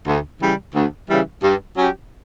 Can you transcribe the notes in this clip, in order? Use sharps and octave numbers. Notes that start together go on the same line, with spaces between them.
D2
C#3 E3 G3
D2
C#3 E3 G3
G2
F#3 C#4 G4